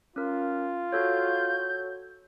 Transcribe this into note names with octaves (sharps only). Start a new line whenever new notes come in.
C#4 F4 A#4
F#4 A4 C#5 G6